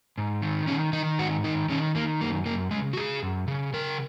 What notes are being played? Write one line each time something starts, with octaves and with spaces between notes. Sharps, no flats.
G#2
D#3
D#3 C#4
D#3 D#4
G#2 F#4
D#3 D#4
D#3 C#4
D#3 A#3
F#2 A#3
F#2 A#3
C#3 G#3
F#4
C#3 G#4
F#2
C#3
C#3 A#4